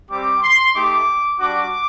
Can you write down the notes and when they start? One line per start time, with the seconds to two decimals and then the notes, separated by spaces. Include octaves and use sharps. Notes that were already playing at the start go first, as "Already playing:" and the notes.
0.09 G3 C4 G4 D6
0.42 C6
0.74 A3 D#4 G4 D6
1.39 G3 D4 F#4 D6